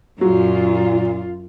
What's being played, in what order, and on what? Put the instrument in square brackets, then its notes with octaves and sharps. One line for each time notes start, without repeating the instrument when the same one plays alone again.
[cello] F#2 [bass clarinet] A#2 [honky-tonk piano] F#3 [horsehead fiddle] F4